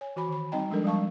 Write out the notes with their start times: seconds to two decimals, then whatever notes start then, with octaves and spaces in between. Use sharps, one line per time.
0.01 C#5 G#5
0.16 E3 F#4 G#5 B5
0.28 D#3 B5
0.52 G3 C4 D#4 D#5 G5 A#5
0.70 F3 G3 G#3 D4 A4 A#4
0.84 F3 G3 G#3 F5 A5 C#6